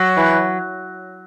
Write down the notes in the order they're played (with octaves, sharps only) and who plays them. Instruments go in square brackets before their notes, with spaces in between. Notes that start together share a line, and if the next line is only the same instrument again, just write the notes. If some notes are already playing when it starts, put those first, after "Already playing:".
Already playing: [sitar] F#3
[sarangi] E3